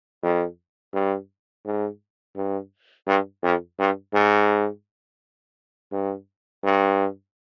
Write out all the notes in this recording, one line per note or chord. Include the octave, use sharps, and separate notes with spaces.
F2
G2
G#2
G2
G2
F2
G2
G#2
G2
G2